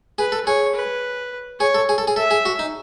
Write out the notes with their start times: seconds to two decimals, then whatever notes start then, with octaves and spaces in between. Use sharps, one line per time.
0.18 G#4 B4
0.32 A4
0.46 G#4 C#5
0.75 B4
1.60 G#4 C#5
1.75 A4
1.89 G#4
1.98 A4
2.07 G#4
2.16 A4 E5
2.31 G#4
2.45 F#4
2.59 D#4